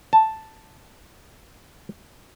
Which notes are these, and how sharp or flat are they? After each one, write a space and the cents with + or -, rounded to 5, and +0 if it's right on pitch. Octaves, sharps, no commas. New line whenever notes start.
A5 +0